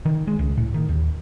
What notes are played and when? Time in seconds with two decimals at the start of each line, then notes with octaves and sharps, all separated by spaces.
0.05 D#3
0.27 G#3
0.39 C#2
0.57 A2
0.74 D#3
0.89 D#2